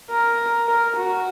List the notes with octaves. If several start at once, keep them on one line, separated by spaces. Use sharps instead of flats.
A#4
A#4
F#4